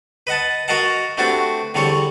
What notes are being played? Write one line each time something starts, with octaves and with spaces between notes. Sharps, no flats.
B4 D#5 F#5 A5
F#4 A#4 D#5 F5 F#5 A5
A3 B3 C4 D4 F#4 G4
E2 D3 G3 C4 C#5 C#6